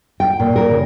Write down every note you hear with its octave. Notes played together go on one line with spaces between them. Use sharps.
G5
A#2
A#4
C#3